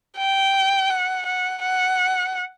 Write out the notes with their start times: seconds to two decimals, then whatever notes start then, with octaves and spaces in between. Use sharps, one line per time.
0.17 G5
0.90 F#5
1.26 F#5
1.62 F#5